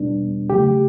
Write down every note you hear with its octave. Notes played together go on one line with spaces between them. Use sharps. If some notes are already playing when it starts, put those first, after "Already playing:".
Already playing: E2 B2 G3 B3 D4
C#2 C#3 F#3 A3 G4